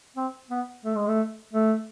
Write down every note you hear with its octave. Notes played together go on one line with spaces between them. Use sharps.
C4
B3
A3
G#3
A3
A3